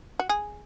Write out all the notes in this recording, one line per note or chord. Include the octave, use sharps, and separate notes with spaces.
F#4
G#4